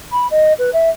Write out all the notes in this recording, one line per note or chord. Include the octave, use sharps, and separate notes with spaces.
B5
D#5
B4
E5